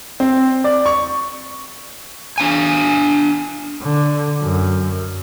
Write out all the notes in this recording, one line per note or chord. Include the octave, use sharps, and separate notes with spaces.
C4
D5
C#6
D4 F5 G#5
D3
F#2